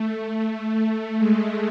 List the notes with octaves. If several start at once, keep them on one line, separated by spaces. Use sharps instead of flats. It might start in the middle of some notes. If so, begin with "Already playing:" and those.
Already playing: A3
A3
G#3